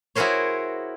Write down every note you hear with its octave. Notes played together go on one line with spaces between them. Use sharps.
E4 F#4 G#4 A#4 C5 C#5